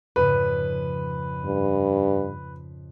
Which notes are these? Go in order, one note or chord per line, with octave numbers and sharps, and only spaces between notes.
F2 G#2 C#3 B4
G2